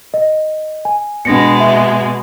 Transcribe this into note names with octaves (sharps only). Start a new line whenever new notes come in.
D#5
G#5
B2 G#3 D4 A#6 C#7
E5